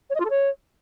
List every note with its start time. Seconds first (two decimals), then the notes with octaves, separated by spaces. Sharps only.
0.09 C#5
0.15 D#5
0.20 F4
0.25 A4
0.30 C#5